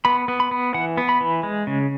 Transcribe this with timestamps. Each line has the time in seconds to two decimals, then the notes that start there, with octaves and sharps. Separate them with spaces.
0.05 B3 B5
0.28 B3
0.40 B5
0.51 B3
0.74 E3 F#5
0.97 B3
1.09 B5
1.21 E3
1.43 G#3
1.67 C#3